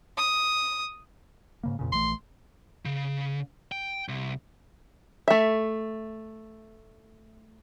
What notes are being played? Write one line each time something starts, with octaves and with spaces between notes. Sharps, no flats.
D#6
G#2 C#3 A#3
F2 A#2 C#3
A#1 E3 A3 C6
C#3
G5
C2
A3 E5